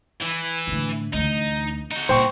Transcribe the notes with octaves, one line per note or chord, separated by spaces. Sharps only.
E3 E4
A2 D3
D2 E3 D#4
D#4 F#4
A#2 G3 C5 G5 C#6